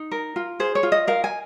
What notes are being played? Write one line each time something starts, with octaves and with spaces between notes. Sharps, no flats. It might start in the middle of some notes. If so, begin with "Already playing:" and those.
Already playing: D#4
A#4
F4
G#4 C5
C#5
F4
D#5
A#4 F5
G#5